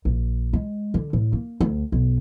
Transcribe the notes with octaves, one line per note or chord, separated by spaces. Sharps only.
A#1
G#3
D3
A2
A#3
D2
B1